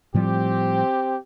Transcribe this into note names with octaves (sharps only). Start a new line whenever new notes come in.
A2 F3 G3 C4 G4